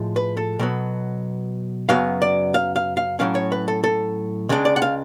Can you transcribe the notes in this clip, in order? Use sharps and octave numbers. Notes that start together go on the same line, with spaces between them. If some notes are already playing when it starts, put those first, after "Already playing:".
Already playing: A2 F3 G#3
B4
A4
B2 F#3 B3
F#2 C#3 F#3 B3 F5
D5
F5
F5
F5
A2 F#3 A3 C#4 F5
C#5
B4
A4
A4
C#2 C#3 G#3 D4
D5
F#5
F5